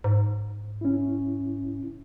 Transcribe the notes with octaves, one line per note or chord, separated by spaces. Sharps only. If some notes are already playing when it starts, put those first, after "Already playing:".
G#2
C#4 E4